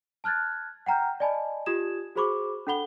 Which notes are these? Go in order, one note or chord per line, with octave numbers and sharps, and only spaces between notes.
A5 F6 F#6 G#6 A6
F#5 G5 A#5 F6 G6
D5 D#5 G#5 A5 B5
F4 G4 D#6 G#6 E7
F#4 G#4 C5 B5 C#6 D6
D4 A4 F#5 B5 G7